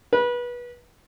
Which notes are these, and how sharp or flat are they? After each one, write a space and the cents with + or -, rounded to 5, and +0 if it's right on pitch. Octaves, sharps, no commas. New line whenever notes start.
B4 -25